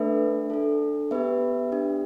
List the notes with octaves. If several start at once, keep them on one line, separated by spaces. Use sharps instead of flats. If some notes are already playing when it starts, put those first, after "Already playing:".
Already playing: A3 D4 A4 B4 E5
D4 A4
B3 G4 B4 E5
D4 G4